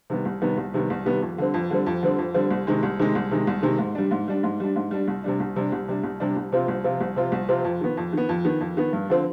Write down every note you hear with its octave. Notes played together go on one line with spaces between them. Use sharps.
C3 D#3 G3 B3
C2
C3 D#3 G3 B3
C2
C3 D#3 G3 B3
C2
C3 D#3 G3 B3
F2
D3 G3 C4
F2
D3 G3 C4
F2
D3 G3 C4
F2
D3 G3 C4
C2
C3 D#3 G#3
C2
C3 D#3 G#3
C2
C3 D#3 G#3
C2
C3 D#3 G#3
G#2
G3 D4
G#2
G3 D4
G#2
G3 D4
G#2
G3 D4
C2
C3 G3 D4
C2
C3 G3 D4
C2
C3 G3 D4
C2
C3 G3 D4
C2
C3 F3 C4 F4
C2
C3 F3 C4 F4
C2
C3 F3 C4 F4
C2
C3 F3 C4 F4
F2
D#3 B3
F2
D#3 B3
F2
D#3 B3
F2
D#3 B3
G2
D3 F3 C4